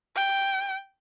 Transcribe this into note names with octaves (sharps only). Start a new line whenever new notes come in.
G5